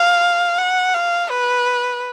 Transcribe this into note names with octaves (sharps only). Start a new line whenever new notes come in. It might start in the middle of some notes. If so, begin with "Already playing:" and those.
Already playing: F5
F#5
F5
B4